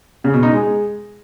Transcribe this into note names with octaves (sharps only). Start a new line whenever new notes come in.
C#3
B2
D#4
G#3